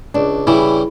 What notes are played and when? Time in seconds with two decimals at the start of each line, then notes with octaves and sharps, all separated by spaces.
0.14 C#2 D4
0.47 C#3 E3 G3 E4